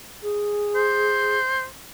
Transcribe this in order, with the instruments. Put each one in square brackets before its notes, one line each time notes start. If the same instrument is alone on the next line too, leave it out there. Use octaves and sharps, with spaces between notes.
[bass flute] G#4
[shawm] C5